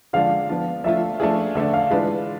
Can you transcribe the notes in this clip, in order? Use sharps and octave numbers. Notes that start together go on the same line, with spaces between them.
D3 F3 G#3 D4 F5
F3 B3 D4 F4
F3 A3 D4 F4 E5
F3 A3 D4 F4 G#4
D3 A3 D4 E5
F5
E3 G#3 D4 F4 B4